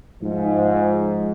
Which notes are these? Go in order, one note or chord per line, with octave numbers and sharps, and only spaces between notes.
G#2 F3